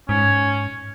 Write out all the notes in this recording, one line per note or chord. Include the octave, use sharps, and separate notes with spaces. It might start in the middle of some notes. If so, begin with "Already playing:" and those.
G#2 C#4